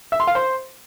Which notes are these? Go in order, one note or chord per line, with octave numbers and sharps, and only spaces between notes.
E5
C6
F5
C5